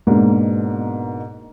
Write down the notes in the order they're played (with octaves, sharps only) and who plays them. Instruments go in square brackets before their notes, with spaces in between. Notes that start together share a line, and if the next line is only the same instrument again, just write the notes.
[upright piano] G#2 B2 A#3 D4